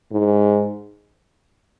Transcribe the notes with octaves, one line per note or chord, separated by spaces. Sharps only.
G#2